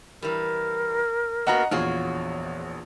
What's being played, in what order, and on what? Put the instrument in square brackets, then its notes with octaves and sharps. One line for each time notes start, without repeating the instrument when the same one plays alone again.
[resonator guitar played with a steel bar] E3 G3 [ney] A#4
[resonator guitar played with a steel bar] A#3 B3 F#4 [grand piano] D#5 F#5 A#5
[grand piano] A#1 E2 [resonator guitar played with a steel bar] F4 F#4 G#4 [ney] C#5